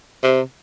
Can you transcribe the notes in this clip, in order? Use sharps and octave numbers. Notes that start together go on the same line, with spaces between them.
C3